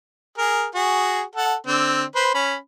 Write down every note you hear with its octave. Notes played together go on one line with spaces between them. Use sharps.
G#4 A#4
F#4 G#4
A4 F#5
D3 C4
B4 C5
C#4 B5